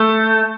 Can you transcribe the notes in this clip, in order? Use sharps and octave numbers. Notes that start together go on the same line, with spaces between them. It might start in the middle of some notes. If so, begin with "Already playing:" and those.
Already playing: A3